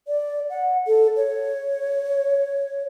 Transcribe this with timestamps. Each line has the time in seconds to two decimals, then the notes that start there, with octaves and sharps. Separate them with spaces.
0.08 D5
0.50 F#5
0.87 A4
1.16 C#5